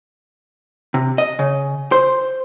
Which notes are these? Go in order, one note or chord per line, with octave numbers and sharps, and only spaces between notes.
C3
D#5
C#3
C5